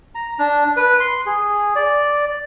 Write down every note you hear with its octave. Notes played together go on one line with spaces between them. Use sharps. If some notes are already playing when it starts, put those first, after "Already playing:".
A#5
D4
B4
C6
G#4
D5